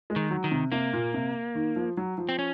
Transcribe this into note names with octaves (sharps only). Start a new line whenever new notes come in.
G#3
D#3
F#3
D#3
C3
C3 A#3
A#2
C3
D#3
F3
F#3
F3
C4
C#4